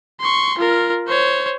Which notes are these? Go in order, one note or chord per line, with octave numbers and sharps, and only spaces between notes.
C6 C#6
F4 A#4
C5 C#5